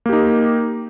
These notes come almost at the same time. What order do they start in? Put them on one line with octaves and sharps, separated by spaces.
A#3 G4 D#4